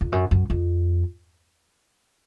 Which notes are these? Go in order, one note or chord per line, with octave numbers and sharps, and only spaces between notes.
F2
F#2
F#2
F2